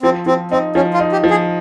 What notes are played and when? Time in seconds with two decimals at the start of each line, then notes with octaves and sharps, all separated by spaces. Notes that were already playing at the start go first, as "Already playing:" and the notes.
0.02 F3 C4
0.26 F3 C4
0.51 C4 D#4
0.75 F3 C#4
0.94 F4
1.00 D#4
1.12 G4
1.24 F3
1.30 G#4